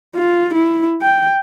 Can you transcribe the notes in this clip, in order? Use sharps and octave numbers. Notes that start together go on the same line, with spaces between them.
F4
E4
G5